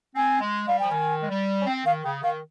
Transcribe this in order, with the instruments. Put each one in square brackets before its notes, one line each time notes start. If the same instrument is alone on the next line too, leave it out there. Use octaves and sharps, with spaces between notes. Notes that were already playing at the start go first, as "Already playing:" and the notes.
[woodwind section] C4 [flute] G#5
[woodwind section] G#3
[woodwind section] G3 [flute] F5
[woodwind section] F3 [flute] G5
[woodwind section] D#3 [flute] G#5
[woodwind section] G#3
G3
C#4
[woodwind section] C4 [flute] G5
[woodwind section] D#3 [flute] F5
[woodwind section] C#3 [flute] G5
[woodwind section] D#3 [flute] F5